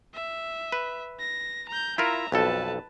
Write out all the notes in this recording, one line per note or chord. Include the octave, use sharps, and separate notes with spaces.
E5
B4
A#6
A#5 G6
E4 F4 A#4 E5 A#5
B1 F2 A4 B4 A5